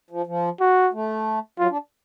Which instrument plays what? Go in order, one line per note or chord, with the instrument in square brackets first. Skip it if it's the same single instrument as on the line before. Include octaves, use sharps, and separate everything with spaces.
[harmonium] F3
F3
[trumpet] F#4
[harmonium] A3
[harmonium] F#3 [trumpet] F4
[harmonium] D4